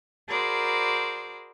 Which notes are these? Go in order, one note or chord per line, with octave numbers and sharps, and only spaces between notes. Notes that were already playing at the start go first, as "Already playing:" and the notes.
F#4 G#4 A#4 C5 D5 B5